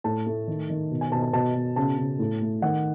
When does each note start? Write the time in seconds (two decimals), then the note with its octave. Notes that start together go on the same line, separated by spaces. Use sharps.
0.04 A2 A5
0.27 A3
0.47 D#3
0.70 D#3
0.91 B2
1.01 G#5
1.12 B2 A5
1.22 A5
1.33 B2 A5
1.55 B2
1.76 C#3 A5
1.97 C#3
2.19 A2
2.42 A3
2.62 D#3 F#5